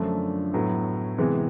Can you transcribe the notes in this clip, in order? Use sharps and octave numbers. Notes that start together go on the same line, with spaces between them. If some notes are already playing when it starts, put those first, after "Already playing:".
Already playing: F#2 D3 F3 A3 D4
A2 F#3 B3
C3 E3 G#3 B3